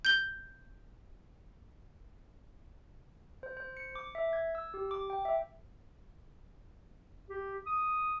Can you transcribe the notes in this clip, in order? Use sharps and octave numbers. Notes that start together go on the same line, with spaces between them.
G6 G7
C5
C5
C#7
D6
E5
G#6
E6
G4
D6
G5
E5
G4
D#6